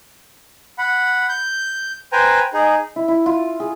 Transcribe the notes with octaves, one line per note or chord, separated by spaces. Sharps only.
F#5 B5
G6
B4 C5 G5 G#5 A#5
D#4 G#4
E4
E4
F4
G#4